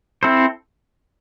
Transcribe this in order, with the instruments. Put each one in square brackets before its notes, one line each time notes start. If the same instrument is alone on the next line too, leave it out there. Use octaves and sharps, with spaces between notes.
[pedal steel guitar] C4 E4 A4 C5